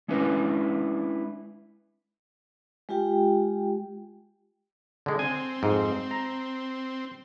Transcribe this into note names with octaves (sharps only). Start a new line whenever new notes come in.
G#3 C#4 D4 E4 B4
G#3 F4 G4 G5
D3 G#3
C4 G#5
F2 G#2
A#5